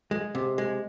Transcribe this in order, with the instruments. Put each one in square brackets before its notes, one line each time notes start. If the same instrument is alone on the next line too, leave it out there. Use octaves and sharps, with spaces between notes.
[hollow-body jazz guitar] G#3
C3
G#3